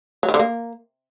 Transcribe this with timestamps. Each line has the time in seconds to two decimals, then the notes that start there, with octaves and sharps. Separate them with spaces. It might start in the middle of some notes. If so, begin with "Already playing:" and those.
0.23 F#3
0.29 D#3
0.34 D3
0.39 A#3